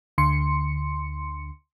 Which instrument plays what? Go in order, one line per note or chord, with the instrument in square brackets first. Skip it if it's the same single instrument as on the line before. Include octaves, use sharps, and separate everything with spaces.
[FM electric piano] D2 D3 C6 C#7